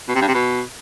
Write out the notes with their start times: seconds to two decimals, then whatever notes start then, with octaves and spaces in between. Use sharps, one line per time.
0.08 B2
0.15 C3
0.21 G2
0.28 C3
0.34 B2